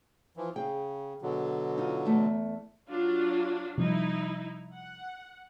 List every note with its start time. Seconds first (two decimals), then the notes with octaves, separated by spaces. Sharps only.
0.37 E3 F3
0.56 C#3 G#4 G5
1.22 B2 D3 F#3
1.78 D#4 F4
2.06 E2 A3
2.88 F#3 D4 F4
3.78 C3 F3 G3 D#4 E4
4.73 F#5